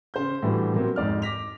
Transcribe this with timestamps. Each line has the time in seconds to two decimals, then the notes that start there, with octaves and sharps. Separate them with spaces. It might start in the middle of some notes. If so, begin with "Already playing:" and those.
0.14 C#3 C5 G6
0.42 A2 E3 G3 D4 F#4
0.74 A#2 D3 F#3 A#3 C4
0.96 F2 G#2 D5 F6
1.22 D6 A#6 B6 F7